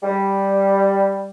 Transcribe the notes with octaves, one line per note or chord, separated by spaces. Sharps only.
G3